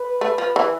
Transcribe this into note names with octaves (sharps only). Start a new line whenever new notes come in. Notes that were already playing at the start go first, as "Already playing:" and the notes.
Already playing: B4
A3
F3
E3